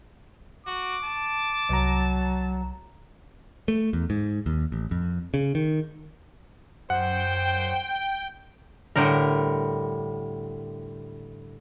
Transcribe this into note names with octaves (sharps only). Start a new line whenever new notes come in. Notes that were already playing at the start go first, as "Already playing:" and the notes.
F#4 D6
A5
C2 F#3 A#5
A3
E2
G#2
D#2
A1
F2
C#3
D#3
F#2 C5 F#5 G5
A2 D3 G3 A#4